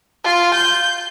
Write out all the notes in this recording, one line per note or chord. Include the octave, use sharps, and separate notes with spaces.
F4
G6